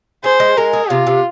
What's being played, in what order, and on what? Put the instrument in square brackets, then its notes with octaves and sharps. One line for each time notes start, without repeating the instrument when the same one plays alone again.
[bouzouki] G#4 [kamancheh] C5
[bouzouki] G#3
[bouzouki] G#3 [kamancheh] A#4
[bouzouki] G#4
[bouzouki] C3 [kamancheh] F4
[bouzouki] C3